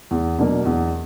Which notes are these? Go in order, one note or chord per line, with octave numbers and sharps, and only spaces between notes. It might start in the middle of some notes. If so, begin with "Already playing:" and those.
E2
B2 F#3 A#3 D4
E2